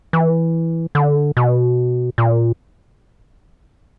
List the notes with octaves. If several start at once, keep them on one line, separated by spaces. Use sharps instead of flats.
E3
D3
B2
A#2